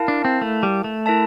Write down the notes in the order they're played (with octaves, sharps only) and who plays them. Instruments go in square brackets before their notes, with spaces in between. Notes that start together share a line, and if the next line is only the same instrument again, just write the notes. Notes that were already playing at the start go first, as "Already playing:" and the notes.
Already playing: [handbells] E4 A#4 F5 A5
[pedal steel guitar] D4
C4
A3
G3
A3
[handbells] E4 A#4 E5 A5